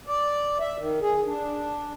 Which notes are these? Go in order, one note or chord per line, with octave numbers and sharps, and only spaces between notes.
D5
E5
D#3
G#4
D4